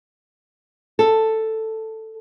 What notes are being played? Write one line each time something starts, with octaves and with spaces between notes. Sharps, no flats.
A4